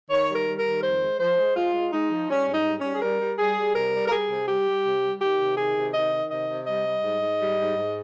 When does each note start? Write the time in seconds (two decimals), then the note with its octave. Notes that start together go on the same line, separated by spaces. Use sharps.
0.10 D#3 C#5
0.29 G3
0.35 A#4
0.47 G3
0.59 A#4
0.66 D#3
0.83 F2 C5
1.02 G#3
1.20 F3 C5
1.38 G#3
1.56 G#3 F4
1.74 G#3
1.92 G#3 D#4
2.11 F3
2.29 G3 C#4
2.47 G#2
2.54 D#4
2.66 G3
2.78 C#4
2.84 G3
2.95 G#4
3.02 G3 A#4
3.20 G3
3.39 G3 G#4
3.57 G3
3.75 C3 A#4
3.93 G3
4.08 A#4
4.12 G3 G#4
4.30 C3
4.48 G3 G4
4.66 G3
4.84 C3
5.03 G3
5.21 D#3 G4
5.39 C3
5.57 D#3 G#4
5.76 C3
5.94 D#3 D#5
6.12 D#3
6.30 C3 D#5
6.48 C3
6.67 G3 D#5
6.85 G3
7.04 G#2
7.21 G#2
7.40 G3
7.59 G#2
7.76 G#2